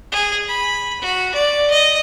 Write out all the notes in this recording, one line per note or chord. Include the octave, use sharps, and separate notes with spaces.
G#4
B5
F#4
D5
D#5